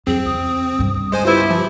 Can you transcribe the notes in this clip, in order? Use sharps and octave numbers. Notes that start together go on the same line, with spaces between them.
F2 C4 G#4
E2 C#3 D#6
G2 C#3
G#3 C5 G#5
B3 E4 F4 G4 C5
F3